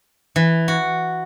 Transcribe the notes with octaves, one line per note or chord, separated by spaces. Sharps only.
E3
F#4